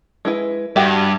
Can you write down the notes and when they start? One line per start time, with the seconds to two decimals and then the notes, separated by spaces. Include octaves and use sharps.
0.25 G#3 E4 B4
0.76 G2 F#4 G4 E5